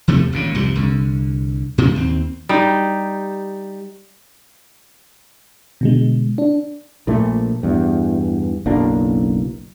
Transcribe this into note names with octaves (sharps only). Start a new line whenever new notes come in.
E2 C3 F3 A3
G#1 A#2 C#3
C2 F2 G#2 G3
C2 D3
A2 C#3 F3 G#3
D#2 C4
G3 D#4
B2 D3 G#3
D4
A#1 A#2 A3
E2 G2
F#1 B1 A#3 D4